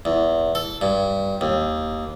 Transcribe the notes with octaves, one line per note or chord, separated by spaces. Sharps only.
E2
A4
G2
D#2